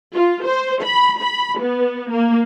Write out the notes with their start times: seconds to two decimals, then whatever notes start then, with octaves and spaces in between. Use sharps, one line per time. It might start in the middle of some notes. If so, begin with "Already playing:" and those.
0.14 F4
0.47 C5
0.83 B5
1.21 B5
1.61 B3
2.13 A#3